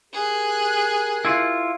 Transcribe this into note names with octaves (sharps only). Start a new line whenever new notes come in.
G4 G#4 A#4 F#6
E4 F4